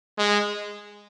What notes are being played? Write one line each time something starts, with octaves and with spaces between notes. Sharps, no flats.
G#3